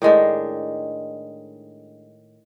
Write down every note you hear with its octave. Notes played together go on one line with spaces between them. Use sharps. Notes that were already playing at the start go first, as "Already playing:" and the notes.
A2 D#3 G#3 D4